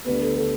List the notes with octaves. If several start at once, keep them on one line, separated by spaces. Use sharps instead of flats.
D2 D3 G3 B3 B4
A4
A4